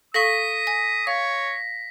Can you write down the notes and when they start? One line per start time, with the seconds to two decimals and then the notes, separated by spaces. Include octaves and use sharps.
0.14 A4 F5 C#6 D#6 A#6 B6
0.67 G#5
1.07 C#5 F5